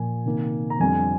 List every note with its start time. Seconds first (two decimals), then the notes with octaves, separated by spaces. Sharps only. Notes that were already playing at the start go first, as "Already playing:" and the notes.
Already playing: A#2 F3 A#3 G#5
0.26 C3 D#3 A#3
0.70 A#5
0.80 F2 D3 G3 C4 G#5